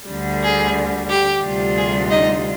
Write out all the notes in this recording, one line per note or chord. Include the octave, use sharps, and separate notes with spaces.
D2 D3 G3
G#4
G4
D2 C3 G3 D4 F4
G#4
D#4 D#5